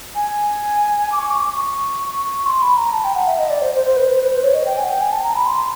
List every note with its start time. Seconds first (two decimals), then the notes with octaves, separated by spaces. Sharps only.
0.15 G#5
1.12 D6
1.19 C#6
1.30 D6
1.42 C#6
2.45 C6
2.62 B5
2.77 A#5
2.92 A5
3.04 G5
3.15 F#5
3.27 E5
3.39 D#5
3.50 D5
3.62 C5
3.74 C5
3.84 C5
3.96 B4
4.08 C5
4.19 B4
4.31 C5
4.43 C#5
4.53 D#5
4.66 G5
4.77 G#5
4.83 F#5
4.88 G5
5.01 G#5
5.12 A5
5.23 A#5
5.35 B5
5.46 C6